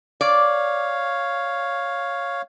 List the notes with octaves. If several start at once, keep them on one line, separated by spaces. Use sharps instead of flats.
C#5 D5 F5